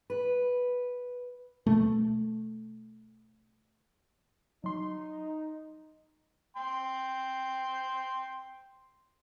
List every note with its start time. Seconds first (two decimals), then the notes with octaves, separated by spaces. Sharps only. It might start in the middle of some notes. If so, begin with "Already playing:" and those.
0.10 B4
1.67 B2 A3
4.64 F#3 D#4 C6
6.56 G5 C6